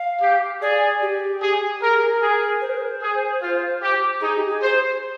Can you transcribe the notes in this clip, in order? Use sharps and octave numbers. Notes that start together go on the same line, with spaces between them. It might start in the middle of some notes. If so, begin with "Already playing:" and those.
Already playing: F5
G4
G#4 D5
G4
G#4
G#4 A#4
A#4
G#4
C5
A#4
C5
G#4
F4
G4
D#4 G#4
G4
G#4
C5